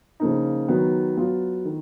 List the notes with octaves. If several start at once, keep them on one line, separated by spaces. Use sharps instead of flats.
C#3 F3 A#3 D#4
D#3 F#3 B3
F#3 B3 F4
D#3